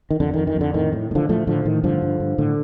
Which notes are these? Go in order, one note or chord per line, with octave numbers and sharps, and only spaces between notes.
D#3
F2 D3
F2 D#3
D#3
F2 D3
A2 D#3
A2
A2
D3 F3
A2 F3 A3
A2 D3 F3
A2 D#3
G2 D3 F3
G2
G2
A2 D3